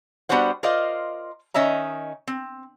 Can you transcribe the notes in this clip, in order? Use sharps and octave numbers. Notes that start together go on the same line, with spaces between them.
G3 B3 D4 F#4 C5 F#5
F4 A#4 C5 D5 D#5 F5
D#3 C#4 D#5 E5 A#5
C4